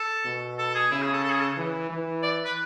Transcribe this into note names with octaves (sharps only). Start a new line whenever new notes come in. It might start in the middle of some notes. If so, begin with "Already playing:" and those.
Already playing: A4
B2
A4
G#4
C#3 E4
G#4
A4
A4
G#4
A4
E3
E3
D5
B4